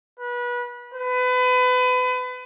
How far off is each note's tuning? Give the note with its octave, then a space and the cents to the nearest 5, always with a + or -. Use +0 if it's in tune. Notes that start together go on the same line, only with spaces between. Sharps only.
B4 -25
B4 +30